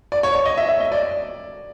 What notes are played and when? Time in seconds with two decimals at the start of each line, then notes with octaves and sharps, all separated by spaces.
0.12 D5
0.23 C#5
0.35 C#5
0.45 D#5
0.57 E5
0.68 E5
0.80 D#5
0.92 D5